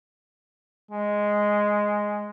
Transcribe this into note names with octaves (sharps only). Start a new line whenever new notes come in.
G#3